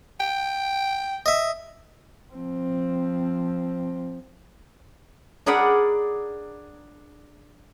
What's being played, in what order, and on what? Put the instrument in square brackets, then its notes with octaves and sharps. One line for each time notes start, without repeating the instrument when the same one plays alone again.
[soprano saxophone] G5
[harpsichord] D#5 E5
[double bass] F3 C4
[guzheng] D4 G#4 A#4 D5 F#5 B5